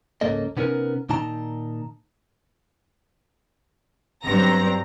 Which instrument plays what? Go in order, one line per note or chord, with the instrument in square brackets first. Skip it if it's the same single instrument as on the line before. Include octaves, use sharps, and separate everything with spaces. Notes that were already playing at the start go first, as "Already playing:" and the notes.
[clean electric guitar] C#2 G#2 A#3 C#4 A4 D#5
C3 B3 C#4 D#4 G#4 A#4
A#2 D#3 D#4 A5 A#5
[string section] G1 G2 F#3 C4 A#5 A#6